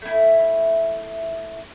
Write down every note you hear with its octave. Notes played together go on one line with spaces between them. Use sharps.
A3 E4